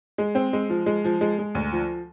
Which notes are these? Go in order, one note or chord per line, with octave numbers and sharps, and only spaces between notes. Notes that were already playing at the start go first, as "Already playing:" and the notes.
G#3
C4
G#3
F3
G#3
F3
G#3
G#3
D2
F3